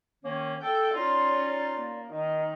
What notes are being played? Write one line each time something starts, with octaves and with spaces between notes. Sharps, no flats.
D#3 A#3 C#4
A4 G5
C#4 D#4 F4 D5
A#3
D#3